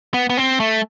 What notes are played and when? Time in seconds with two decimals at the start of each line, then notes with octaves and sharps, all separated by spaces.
0.14 B3
0.30 B3
0.37 C4
0.60 A3